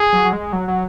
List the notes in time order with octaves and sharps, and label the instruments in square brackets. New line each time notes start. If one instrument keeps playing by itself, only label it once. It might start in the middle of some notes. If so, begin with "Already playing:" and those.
Already playing: [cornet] G#4
[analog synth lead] F#3
F#3
G#3
F#3
F#3